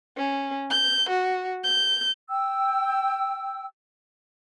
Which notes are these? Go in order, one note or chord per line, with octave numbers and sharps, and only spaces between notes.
C#4
G6
F#4
G6
G5 E6